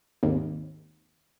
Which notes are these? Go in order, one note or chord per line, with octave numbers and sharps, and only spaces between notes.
G#1 D#2